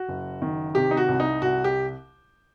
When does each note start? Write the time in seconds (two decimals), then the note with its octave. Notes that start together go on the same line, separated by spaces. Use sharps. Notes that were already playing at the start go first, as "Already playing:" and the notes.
Already playing: F#4
0.08 F#1
0.42 D#3
0.75 C3 G4
0.91 D#4
0.97 F#4
1.08 C2
1.20 D#4
1.42 C2 F#4
1.64 G4